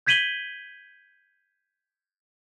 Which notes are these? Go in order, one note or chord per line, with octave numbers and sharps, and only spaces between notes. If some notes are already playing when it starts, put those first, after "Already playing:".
G6 G#6 B6 D#7 F#7 G7